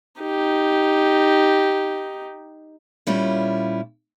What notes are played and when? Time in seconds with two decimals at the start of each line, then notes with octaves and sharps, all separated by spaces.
0.22 D#4 G4
3.07 A#2 G3 C#4 E4 F4